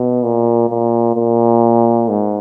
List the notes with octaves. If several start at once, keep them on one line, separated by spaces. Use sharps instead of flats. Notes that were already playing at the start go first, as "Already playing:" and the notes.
Already playing: B2
A#2
A#2
A#2
G#2